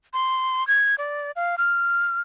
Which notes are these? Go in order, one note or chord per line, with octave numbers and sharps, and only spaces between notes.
C6
G#6
D5
F5
F6